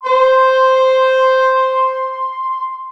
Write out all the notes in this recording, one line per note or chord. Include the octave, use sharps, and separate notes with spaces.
C5 C6